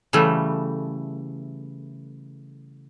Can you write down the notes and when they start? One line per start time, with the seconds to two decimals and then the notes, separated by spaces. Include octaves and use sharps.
0.13 C#3 E3 G3 A3